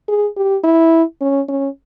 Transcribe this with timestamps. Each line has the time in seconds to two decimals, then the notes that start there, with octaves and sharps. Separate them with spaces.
0.09 G#4
0.37 G4
0.64 E4
1.21 C#4
1.49 C#4